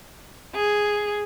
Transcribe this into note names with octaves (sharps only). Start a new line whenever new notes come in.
G#4